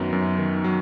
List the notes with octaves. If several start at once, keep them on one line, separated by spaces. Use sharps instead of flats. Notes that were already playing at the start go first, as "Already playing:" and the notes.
Already playing: F#2 D#3 F#3 B3
F#2
D#3
F#3